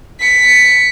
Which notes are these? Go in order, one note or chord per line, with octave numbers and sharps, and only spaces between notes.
B6 C#7